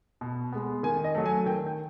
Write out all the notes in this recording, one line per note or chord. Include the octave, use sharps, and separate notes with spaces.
B2
G#3 B3
D#3 G#5
D#5
F#3 A3
G#5
D#3 G5
G5